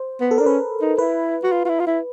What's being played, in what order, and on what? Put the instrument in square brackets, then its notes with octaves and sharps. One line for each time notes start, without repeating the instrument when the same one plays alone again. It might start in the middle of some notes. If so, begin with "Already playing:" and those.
Already playing: [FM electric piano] C5
[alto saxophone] B3
[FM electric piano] A4
[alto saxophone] D4 [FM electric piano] A#4
[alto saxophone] C#4 [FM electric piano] B4
[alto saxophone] D#4
[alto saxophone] E4 [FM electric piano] B4
[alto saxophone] F#4
F4
F4
E4
F4
E4